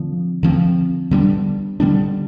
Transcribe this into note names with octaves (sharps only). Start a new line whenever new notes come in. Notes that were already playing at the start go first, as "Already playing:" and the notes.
Already playing: D3 F3 C4
D3 F3 C4
D3 G3 B3 D4
D3 G3 B3 D4